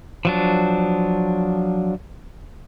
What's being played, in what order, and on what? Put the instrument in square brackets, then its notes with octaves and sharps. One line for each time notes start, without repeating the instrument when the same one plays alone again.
[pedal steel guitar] F3 F#3 D4